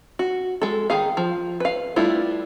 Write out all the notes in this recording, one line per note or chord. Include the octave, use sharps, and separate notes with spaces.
F#4
G#3 A4
D#3 D#4 G#4 F5
F3
B4 F5
G3 A3 D4 E4 F4